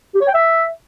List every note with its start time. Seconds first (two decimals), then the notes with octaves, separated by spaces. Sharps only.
0.14 G4
0.21 C#5
0.27 G5
0.34 E5